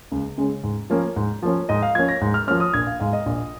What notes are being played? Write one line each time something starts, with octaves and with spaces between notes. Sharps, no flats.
C#2
C#3 G#3 C#4
G#2
F3 A#3 C#4
G#2
F3 A#3 C#4
G#2 D#5
F5
F3 A#3 C#4 G#6
A#6
G#2
F6
F3 A#3 C#4 F6
D#6
A#1 G#6
F5
G#2 G#3 F5
D#5
A#1